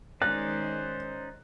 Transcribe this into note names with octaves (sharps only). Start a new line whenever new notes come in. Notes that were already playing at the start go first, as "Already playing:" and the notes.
D#3 G#3 C#4 D#4 C5 D5 F#6